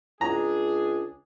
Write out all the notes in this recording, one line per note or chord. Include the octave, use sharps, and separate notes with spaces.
C#2 D4 G#4 A#5